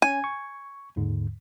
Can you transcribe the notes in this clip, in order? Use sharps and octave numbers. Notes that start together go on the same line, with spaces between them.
C#4 G#5
C#6
D#2 G#2 D3